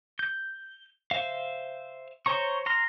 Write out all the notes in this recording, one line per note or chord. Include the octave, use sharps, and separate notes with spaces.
G6
C5 E5 F5
C5 C#5 A#5 C#6
A#5 C6 F6